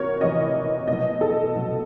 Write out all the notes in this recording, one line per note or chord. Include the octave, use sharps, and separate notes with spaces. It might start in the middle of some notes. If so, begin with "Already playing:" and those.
Already playing: C3 E3 F#4 A#4 C#5
C3 E3 D#5
B2 F#3 D#5
A4
B2 F#3